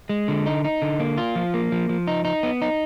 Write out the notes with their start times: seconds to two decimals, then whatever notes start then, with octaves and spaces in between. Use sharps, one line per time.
0.09 G#3
0.28 D3
0.46 D#4
0.64 D#4
0.82 D3
1.00 A#3
1.18 F4
1.35 F3
1.54 A#3
1.72 F3
1.89 F3
2.08 D#4
2.25 D#4
2.43 B3
2.62 D#4